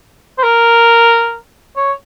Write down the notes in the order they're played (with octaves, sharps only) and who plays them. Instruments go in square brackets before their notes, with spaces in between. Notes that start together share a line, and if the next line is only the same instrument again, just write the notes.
[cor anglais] C5
A#4
C#5